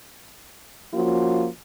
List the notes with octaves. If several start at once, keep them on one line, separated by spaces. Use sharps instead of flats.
F3 A#3 C#4 F4 F#4